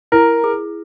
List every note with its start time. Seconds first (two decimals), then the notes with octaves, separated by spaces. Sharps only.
0.12 E4 A#4
0.44 G#4